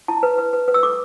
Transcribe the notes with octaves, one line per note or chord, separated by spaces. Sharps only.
E4 A5
B4
B4
B4
B4
E6
A4 D6